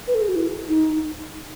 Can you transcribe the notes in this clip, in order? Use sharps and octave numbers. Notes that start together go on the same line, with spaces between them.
B4
A4
G#4
F#4
E4
D#4